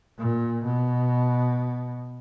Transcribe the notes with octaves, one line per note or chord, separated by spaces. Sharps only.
A#2
B2